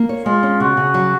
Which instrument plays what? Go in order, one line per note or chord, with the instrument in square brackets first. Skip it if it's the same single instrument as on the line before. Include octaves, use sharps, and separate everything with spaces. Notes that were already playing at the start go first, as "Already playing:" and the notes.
Already playing: [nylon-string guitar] A#3
C#5
[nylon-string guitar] G#3 [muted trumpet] F4
[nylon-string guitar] C#4
[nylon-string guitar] C#3 [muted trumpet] F#4
[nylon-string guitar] C#3
F#3